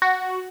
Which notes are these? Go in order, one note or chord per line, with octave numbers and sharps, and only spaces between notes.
F#4